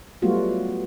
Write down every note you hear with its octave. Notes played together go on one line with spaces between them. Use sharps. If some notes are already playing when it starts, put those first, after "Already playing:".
F#3 G3 A3 B3 F4 F#4